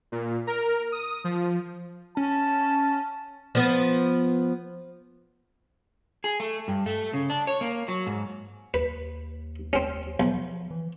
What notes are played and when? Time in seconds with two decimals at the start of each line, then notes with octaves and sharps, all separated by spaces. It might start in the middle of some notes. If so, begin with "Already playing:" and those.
0.12 A#2
0.47 A#4
0.92 D#6
1.24 F3
2.17 C#4 A5
3.55 F3 B3
6.24 G#4
6.40 A3
6.68 G2
6.86 A3
7.13 C#3
7.30 D4
7.47 C#5
7.61 A#3
7.88 F#3
8.07 G#2
8.74 D#2 B4
9.73 C4 C#4
10.20 B1 F3
10.71 E3